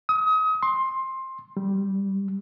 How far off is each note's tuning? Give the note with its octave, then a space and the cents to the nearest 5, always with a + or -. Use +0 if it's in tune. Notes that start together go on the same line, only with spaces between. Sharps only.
D#6 +30
C6 +15
G3 -5